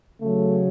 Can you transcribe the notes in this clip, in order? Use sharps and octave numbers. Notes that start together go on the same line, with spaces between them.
C#3 F#3 A3